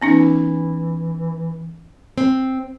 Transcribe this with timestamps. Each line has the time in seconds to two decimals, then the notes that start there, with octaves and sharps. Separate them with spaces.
0.02 E3 B3 C#4 D#4
2.18 C4